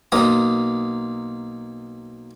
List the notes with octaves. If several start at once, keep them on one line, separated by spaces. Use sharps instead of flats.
B1 A#3 D#6